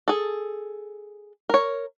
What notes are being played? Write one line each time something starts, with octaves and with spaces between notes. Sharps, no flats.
G#4 A4
A#4 C#5